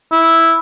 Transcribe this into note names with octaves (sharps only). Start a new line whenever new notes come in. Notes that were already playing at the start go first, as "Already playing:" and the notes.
E4